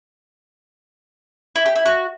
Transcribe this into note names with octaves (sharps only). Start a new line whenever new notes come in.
E4
G4
E4
F#4